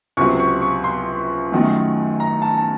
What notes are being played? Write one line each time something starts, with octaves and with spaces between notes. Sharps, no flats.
C#2 C3 F#3 C#6
C#6
C#6
C6
F#2 D#3 F#3 A3
A#5
A5
A5